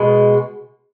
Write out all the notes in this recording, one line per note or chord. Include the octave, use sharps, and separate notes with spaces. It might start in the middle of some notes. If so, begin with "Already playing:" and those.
Already playing: B2 G#3